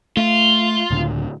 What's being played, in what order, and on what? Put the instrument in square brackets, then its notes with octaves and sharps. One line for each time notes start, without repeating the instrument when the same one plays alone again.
[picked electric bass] A3 [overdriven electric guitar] F4
[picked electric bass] C#2 A2 D3